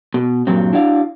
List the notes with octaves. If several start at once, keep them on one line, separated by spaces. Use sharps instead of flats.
B2
G2 A#2 F#3 C4
D4 E4 F#4 D5 F5